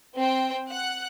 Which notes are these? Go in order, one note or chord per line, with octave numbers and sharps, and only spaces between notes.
C4 C5 G5
F#5 F#6